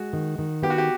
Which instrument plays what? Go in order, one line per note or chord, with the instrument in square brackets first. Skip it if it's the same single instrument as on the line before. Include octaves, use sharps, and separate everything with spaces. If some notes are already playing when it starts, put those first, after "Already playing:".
Already playing: [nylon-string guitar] G#3 [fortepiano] F#4
[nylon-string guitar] D#3
D#3
[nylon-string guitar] B3 [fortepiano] G4
[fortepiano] F#4
G4